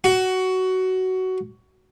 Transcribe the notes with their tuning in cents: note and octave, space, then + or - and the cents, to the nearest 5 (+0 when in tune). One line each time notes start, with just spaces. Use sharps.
F#4 +15